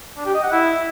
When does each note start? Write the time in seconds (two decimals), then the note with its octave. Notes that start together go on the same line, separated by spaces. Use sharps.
0.16 D4
0.25 G4
0.34 D#5
0.43 F#5
0.52 E4